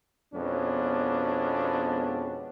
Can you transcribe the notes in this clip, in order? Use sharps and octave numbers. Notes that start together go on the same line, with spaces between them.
F2 B2 G#3 B3 C#4 D4